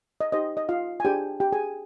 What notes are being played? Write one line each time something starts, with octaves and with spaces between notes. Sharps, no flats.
D#5
D#4 G4 C5 D#5
D#5
F4 F5
G#5
D4 G4 G#4 C5 G5
G4 G5
G#4 G#5